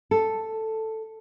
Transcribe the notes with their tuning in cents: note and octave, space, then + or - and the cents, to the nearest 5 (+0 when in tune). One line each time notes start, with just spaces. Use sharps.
A4 +5